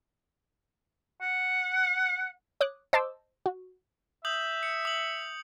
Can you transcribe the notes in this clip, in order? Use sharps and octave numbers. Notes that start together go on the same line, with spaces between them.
F#5
C#5 D6 D#6 F#6
C5 D#5 A5 C6 D6 E6
F#4
E5 D#6 G6 F#7
C#7
D#6 F#7